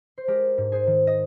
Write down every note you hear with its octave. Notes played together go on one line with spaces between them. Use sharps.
C5
G#3 G4 A#4
G#2
G#4 C5
D#3
D#5